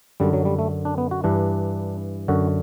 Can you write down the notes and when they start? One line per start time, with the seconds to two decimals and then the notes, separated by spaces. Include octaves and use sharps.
0.20 F#2 D3 G3
0.33 F#3
0.45 G3
0.59 A3
0.85 D4
0.98 B3
1.11 F#4
1.24 G2 E3 D4
2.28 F#2 D3 F#4